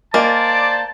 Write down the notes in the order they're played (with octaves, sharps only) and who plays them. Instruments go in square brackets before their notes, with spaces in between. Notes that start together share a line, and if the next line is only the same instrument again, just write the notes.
[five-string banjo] A#3 [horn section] C5 D5 [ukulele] D#5 G#5 [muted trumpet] A5